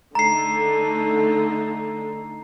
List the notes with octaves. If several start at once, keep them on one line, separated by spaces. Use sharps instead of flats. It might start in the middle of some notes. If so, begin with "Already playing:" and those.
D3 A3 D#4 A#5 C7